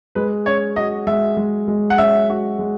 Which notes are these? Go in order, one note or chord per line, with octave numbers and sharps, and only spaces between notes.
G#3 B4
C#4 C#5
F#4 D#5
G#3 E5
G#3
G#3
F#5
C#4 E5
F#4
G#3